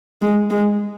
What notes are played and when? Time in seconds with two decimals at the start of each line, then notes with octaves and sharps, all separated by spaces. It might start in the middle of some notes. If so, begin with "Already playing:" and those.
0.22 G#3
0.50 G#3